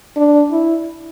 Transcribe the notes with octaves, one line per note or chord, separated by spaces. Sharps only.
D4
E4